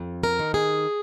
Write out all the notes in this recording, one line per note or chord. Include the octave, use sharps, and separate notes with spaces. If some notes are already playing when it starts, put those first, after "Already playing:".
Already playing: F2
A#4
D#3
G#4